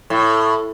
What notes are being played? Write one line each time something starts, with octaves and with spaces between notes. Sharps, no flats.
A2